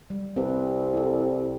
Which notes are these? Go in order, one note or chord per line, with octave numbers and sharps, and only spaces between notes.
G3
C2 C4 B4
E4 A4